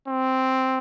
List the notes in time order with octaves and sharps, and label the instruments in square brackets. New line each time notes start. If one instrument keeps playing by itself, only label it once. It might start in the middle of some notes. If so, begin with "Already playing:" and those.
[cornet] C4